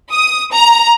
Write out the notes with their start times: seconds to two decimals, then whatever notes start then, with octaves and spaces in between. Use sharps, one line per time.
0.12 D#6
0.52 A#5